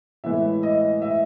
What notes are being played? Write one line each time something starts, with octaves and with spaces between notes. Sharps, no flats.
A2 E3 G#3 B3 E5
D#5
E5